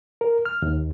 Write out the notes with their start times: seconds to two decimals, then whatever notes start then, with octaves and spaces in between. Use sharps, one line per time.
0.21 A#4
0.45 F6
0.62 D#2